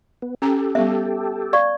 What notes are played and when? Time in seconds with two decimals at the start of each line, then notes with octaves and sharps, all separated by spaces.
0.22 B3
0.42 C#4 G4 A4 A#5
0.75 G3 B3 E5
1.53 D5 F5 C#6